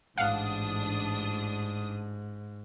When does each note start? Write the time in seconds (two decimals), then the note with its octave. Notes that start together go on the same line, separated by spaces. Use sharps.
0.18 A1 G#2 D4 F5 F#5 D#6